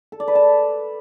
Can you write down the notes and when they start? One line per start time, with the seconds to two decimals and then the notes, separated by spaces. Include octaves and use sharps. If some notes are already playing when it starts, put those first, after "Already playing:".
0.12 A4
0.20 D5
0.28 B4
0.35 A5